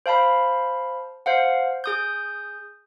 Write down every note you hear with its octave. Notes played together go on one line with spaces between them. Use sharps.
C5 F5 A5 B5
C5 F5 F#5
G#4 D#6 G6